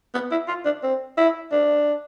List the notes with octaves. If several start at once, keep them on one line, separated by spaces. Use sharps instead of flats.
B3
E4
F4
D4
C4
E4
D4